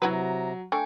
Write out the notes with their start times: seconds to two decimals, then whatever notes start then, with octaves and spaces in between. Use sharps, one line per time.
0.02 C3 F#3 E4 F#4 B4 A#5
0.72 A3 D4 G5 G#5